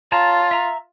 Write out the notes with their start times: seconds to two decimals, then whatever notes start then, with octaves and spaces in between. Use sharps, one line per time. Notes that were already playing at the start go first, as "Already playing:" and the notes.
0.12 F4 C#5 A5 A#5
0.51 E5 A#5